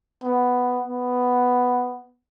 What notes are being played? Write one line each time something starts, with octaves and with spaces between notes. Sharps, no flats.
B3
B3